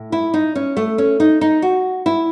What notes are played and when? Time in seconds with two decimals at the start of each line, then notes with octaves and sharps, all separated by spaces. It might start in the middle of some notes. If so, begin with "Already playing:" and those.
Already playing: A2
0.12 E4
0.34 D#4
0.55 C#4
0.77 A3
0.98 C#4
1.20 D#4
1.41 D#4
1.62 F#4
2.06 E4